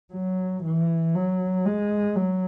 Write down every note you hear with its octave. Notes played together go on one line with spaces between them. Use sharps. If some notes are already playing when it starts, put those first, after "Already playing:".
F#3
E3
F#3
G#3
F#3